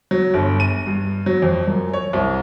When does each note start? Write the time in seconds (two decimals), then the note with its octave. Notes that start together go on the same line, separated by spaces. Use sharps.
0.11 F#3
0.34 G1
0.60 D#7
0.87 G2
1.26 F#3
1.42 F2
1.67 F#2
1.93 C#5
2.13 C2